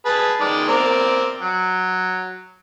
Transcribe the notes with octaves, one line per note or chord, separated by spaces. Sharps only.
G#4 B4 A5
D#3 G#3 D5
C4 A#4 D5
F#3